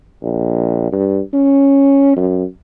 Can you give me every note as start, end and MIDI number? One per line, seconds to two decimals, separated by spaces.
0.23 0.92 34
0.92 1.20 43
1.33 2.16 61
2.16 2.44 42